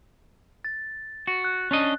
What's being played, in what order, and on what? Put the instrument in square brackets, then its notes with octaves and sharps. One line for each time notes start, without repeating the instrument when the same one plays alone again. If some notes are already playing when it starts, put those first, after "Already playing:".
[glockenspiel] A6
[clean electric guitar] F#4
[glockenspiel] F#6
[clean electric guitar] C#4 D4 D#5